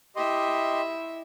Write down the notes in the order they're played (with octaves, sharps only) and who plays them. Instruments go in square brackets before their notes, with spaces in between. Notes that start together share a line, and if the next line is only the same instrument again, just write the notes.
[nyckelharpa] E4 E5 [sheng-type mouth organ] G4 D#5 C6